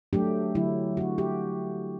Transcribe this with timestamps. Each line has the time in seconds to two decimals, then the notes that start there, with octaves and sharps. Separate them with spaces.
0.13 F#3 A3 D4 G4
0.55 D3 F#3 A3 E4
0.97 D3 F#3 A3 F#4
1.18 G4